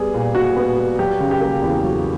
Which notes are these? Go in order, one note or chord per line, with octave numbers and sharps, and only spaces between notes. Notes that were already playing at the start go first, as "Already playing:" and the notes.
Already playing: G3 B3 G#4
A#2
A#2 F#4
B3
G3
F#3 G4
C#3
G4
A#3
E2
F#3